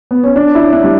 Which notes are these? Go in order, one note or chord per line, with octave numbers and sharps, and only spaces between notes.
B3
C#4
D4
E4
D4
G3